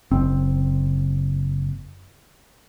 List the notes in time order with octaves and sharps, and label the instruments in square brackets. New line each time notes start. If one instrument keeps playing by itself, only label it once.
[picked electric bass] F#1 C4